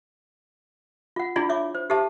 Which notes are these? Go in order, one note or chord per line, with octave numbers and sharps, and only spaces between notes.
F4 F#5
D4 E4 F4 G#4 D5 B5
C#5 E5 D6
C5
G4 A4 C5 E5 A5